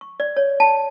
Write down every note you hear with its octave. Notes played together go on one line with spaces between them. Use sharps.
C#6
D5
C#5
A5